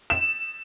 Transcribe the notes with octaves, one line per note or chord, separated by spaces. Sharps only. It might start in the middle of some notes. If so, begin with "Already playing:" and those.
E7